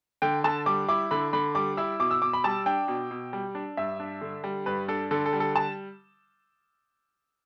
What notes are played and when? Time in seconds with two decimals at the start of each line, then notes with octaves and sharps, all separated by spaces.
0.22 D3 G5
0.44 D3 A5
0.66 G3 D6
0.88 E4 D6
1.11 D3 B5
1.33 D3 B5
1.55 G3 D6
1.77 E4 E6
2.00 B2 D6
2.11 E6
2.22 B2 D6
2.33 B5
2.44 G3 A5
2.66 D4 G5
2.88 B2
3.11 B2
3.33 G3
3.55 D4
3.77 G2 E5
4.00 D4
4.21 D3
4.44 G3
4.66 G2 B4
4.88 D4 A4
5.11 D3 A4
5.26 A4
5.33 G3
5.40 A4
5.56 A5